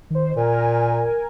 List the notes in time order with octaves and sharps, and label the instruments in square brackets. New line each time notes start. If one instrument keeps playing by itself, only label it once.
[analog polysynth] D#3 C5
[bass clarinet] A#2 [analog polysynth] A#4 G#5